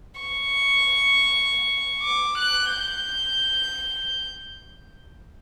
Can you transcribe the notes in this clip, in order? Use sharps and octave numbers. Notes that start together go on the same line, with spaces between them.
C#6
D6
F#6
G6